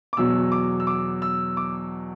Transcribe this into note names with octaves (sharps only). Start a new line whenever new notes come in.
D6
E2 B2 F#3 E6
D6
E6
D6
E6
D6